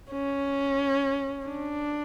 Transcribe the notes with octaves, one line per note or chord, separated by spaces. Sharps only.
C#4
D4